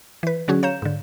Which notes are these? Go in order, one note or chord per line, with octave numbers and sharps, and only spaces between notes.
E3 B4
D3 F#3 C#4 F#4 G#4
C#5 F5 A#5 G6 E7
G#2 D3